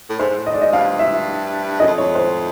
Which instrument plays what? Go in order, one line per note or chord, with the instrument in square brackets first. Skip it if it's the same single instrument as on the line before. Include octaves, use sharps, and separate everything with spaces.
[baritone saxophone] A2
[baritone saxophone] G#2 [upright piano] C5
[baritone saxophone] G#2
A2
[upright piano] D#5
[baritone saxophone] G#2 [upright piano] D5
[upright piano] D#5
[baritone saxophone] G2 [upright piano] F5
[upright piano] E5
[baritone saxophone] F#2 [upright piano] D#5
[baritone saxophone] F2
[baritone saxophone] F2 [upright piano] C#5
[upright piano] C5